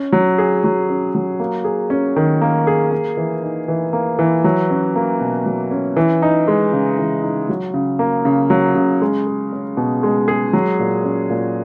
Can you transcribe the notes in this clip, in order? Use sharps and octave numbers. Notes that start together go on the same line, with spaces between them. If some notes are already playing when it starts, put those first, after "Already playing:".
Already playing: C#4
F#3
G#4
F#3
C#4
F#3
A#3
G#4
C#4
D#3
A#3
G#4
A#3
E3
D#4
E3
A#3
E3
F#3
C#4
A#3
B2
F#3
C#4
E3
D#4
G#3
C#3
E3
D#4
F#3
C#3
A#3
C#3
F#3
C#3
G#3
G#4
C#4
B2
G#3
G#4
F#3
A#2
C#4
A#2